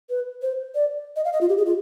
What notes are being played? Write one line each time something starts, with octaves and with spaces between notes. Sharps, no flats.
B4
C5
D5
D#5
F5
D#5
F4
G4
G#4
F4